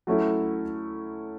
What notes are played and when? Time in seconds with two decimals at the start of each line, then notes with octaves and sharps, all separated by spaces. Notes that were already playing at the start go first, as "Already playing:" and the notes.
0.07 F#3 A3 C#4 E4